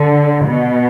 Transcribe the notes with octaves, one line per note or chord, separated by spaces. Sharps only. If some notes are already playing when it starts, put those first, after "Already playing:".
Already playing: D3
B2